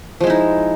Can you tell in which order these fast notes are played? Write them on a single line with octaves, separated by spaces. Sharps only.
F3 G#3 E4 D#4